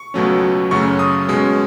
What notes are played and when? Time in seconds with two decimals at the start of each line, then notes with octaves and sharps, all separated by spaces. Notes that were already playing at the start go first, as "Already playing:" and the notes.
Already playing: C#6
0.14 C#2 B2 F#3 A3 C#4
0.71 F#2 C#3 F#3 A3 C#4 C#6
0.99 D#6
1.28 B2 G#3 C#4